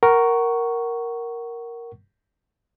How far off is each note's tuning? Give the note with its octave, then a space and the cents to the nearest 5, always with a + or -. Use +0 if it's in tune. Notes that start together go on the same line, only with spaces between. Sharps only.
A#4 +0 F#5 +25 C#6 +0